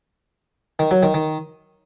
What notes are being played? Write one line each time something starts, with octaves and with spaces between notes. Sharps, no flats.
D#3
F#3
D#3
D#3